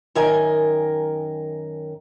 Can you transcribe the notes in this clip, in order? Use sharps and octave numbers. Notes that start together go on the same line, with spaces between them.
F#2 D#3 A#4 D#5 G#5